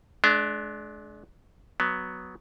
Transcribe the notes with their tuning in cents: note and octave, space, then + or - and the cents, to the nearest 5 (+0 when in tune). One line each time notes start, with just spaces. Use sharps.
G#3 +40 D4 -5
F#3 +0 B3 +0